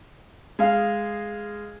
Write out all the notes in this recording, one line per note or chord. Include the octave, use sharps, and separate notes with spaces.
G#3 F5